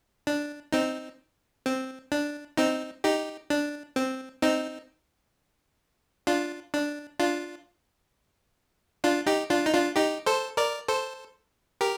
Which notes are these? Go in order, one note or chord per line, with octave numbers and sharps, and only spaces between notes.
D4
C4 D#4
C4
D4
C4 D#4
D#4 G4
D4
C4
C4 D#4
D4 F4
D4
D4 F4
D4 F4
D#4 G4
D4 F4
D#4
D4 F4
D#4 G4
A4 C5
A#4 D5
A4 C5
G4 A#4